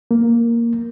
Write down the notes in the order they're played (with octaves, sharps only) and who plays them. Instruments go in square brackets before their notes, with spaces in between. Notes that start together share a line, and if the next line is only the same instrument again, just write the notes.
[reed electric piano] A#3